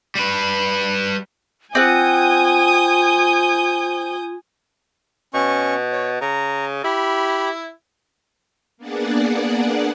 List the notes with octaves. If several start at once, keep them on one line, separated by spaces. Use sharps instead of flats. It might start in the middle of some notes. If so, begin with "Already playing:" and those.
G3 B4
C4 F4 F#5 G#5 D#6 G6
B2 C#4 C#6
C#5
C#3 A#5
E4 G4 B5
A#3 B3 D4 G#4 D5 F#5